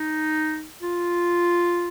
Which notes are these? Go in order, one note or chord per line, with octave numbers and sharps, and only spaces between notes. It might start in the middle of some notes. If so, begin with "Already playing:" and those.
Already playing: D#4
F4